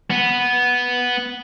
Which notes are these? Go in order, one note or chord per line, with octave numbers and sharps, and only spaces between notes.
B3